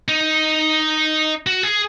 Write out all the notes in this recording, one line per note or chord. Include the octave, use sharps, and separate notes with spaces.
D#4
F#4
G#4